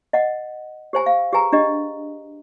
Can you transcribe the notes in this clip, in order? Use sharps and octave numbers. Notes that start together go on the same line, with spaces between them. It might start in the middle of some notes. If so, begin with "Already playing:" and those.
D#5 F#5
G4 C5 G#5 B5
F5
G4 G#4 B4 G#5 A#5
D4 G4 D#5